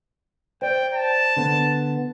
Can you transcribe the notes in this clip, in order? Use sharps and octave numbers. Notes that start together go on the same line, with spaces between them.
C5 D5 G5
A5
D3 B3